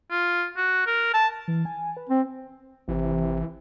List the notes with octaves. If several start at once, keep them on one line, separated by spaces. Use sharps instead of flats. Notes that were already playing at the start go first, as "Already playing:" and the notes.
F4
F#4
A#4
A5
E3
G#5
B4
C4 C5
G#1 C3 E3